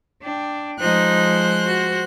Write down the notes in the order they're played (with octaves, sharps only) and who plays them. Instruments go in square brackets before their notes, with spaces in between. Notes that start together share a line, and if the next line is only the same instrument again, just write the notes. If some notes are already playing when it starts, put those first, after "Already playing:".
[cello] D4 G5
[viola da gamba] F3 G#3 [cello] D#4 [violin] C5 F#6
[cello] F#4